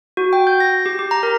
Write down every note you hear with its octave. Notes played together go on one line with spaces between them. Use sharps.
F#4
G5
G6
A#6
G4
G4
A#5
A#4